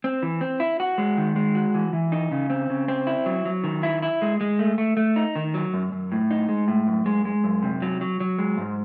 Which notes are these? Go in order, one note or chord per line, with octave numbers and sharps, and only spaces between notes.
C4
E3
C4
E4
F#4
G#3
D#3
G#3
F#4
E3
E3
D#4
C#3
C4
C#3
C4
E4
F#3
F#3
D#3
E4
E4
G#3
G#3
A3
A3
A3
D#4
D#3
F#3
F#2
F#2
A2
D#4
G#3
A2
F#2
G#3
G#3
F#2
C3
F#3
F#3
F#3
G#3
G#2